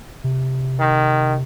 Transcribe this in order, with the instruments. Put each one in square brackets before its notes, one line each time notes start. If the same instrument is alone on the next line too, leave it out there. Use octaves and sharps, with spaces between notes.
[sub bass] C3
[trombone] D#3